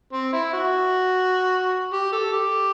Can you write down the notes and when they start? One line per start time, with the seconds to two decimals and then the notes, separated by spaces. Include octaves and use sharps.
0.13 C4
0.33 E4
0.53 F#4
1.93 G4
2.13 A4
2.33 G4